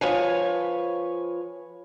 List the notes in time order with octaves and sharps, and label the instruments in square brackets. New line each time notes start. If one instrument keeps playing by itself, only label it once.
[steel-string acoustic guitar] F3 B4 C#5 G#5